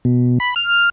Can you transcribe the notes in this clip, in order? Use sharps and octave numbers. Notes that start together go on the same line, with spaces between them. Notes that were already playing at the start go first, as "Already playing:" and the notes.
B2
B5
F6